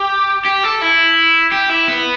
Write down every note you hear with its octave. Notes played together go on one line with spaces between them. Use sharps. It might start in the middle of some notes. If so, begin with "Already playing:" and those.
Already playing: G4
G4
A4
E4
G4
E4
B3